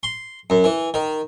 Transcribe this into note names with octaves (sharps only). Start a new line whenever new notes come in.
C6
F#2
E3
D#3